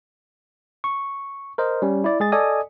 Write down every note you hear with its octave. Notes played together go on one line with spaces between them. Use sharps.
C#6
A#4 C5 D#5
G3 C#4
E4 D5
G#3 G#4 A6
A4 D5 D#5 G#5 D#6